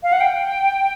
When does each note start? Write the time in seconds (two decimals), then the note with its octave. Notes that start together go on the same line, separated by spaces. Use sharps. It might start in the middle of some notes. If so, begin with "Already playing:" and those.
0.03 F5
0.13 F#5
0.21 G5